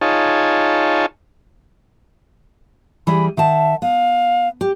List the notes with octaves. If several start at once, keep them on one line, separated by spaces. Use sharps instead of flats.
D#4 F4 G#4 C#5 A5
E3 G3 G#4 B5
D#3 E5 F#5 A5
B3 F5
G4